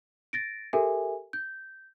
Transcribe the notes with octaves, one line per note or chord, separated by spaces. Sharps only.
A6 A#6 D7
G4 A4 A#4 E5 G#5
G6